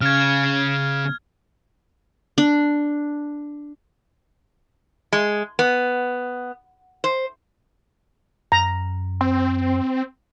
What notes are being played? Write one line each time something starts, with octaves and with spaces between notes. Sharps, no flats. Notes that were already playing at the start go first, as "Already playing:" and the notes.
C#3 F6 G#6
D4
G#3
B3
C5
F#2 A#5
C4